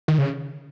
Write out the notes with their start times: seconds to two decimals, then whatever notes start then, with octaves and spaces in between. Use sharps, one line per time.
0.08 D#3
0.18 C#3